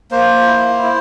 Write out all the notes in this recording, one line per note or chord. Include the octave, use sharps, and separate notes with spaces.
A#3 C5
E4
E4